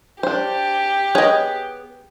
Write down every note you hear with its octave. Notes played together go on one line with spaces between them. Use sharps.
D4 G4 C5
B3 G#4 C#5 D#5